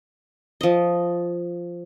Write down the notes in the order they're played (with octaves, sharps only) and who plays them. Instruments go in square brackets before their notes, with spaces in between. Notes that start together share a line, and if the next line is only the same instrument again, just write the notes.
[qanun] F3 D#5